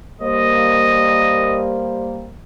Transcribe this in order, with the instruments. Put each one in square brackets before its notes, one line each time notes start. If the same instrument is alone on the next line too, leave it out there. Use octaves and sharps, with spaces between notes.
[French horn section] G3 A#3 C5 [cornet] D#5